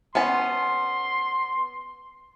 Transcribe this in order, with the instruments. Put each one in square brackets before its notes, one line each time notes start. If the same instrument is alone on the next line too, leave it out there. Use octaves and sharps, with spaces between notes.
[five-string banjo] B3 C#4 A5 [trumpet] C6